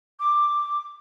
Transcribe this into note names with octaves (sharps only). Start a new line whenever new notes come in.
D6